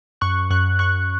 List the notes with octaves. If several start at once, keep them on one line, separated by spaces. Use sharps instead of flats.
F#2 C#6 F#6
F#2 C#6 F#6
F#2 C#6 F#6